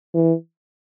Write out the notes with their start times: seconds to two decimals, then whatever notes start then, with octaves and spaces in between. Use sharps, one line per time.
0.14 E3